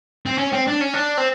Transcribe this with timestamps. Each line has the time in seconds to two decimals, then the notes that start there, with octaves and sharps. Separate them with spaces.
0.26 C4
0.38 C#4
0.52 C4
0.67 D4
0.81 C#4
0.93 D4
1.17 C4